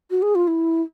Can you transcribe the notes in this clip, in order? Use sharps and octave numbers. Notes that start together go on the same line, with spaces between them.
F#4
G#4
F4
E4